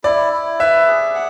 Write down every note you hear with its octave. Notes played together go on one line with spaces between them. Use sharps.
E4 D5
E4
B4 E5
G#4
F#5